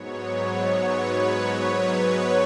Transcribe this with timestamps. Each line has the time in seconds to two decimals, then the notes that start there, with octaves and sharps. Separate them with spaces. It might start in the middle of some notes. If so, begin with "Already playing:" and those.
Already playing: G#2 F#3 B3 C#5
0.28 C#5
0.75 B4
1.21 B4
1.68 B4
2.00 B4